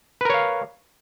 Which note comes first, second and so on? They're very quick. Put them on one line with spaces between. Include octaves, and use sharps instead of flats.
B4 A#4 C#5 F5